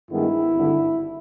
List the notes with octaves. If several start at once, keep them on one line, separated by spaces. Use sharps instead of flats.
G2 D#3 G#3 B3 E4
G#1 G2 D3